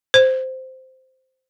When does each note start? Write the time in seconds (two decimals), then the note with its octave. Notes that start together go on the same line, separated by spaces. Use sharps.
0.14 C5